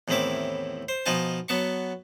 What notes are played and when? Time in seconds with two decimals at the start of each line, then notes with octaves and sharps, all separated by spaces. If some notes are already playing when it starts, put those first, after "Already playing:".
0.08 E2 A2 D#3 C4 E4 D6
0.89 C5
1.06 B2 F3 D#4 F4 G#5 A5
1.48 F#3 B3 A5 C#6